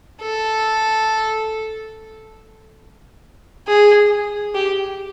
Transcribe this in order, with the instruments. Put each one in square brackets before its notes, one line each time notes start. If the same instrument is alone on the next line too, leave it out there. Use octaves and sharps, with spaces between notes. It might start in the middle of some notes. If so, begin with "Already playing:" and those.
[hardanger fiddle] A4
G#4
G4